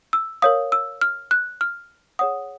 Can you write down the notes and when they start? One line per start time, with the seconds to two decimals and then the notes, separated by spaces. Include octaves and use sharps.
0.13 E6
0.42 A#4 C#5 F5 D#6
0.72 E6
1.01 F6
1.31 F#6
1.61 F6
2.19 G#4 C#5 F#5 D#6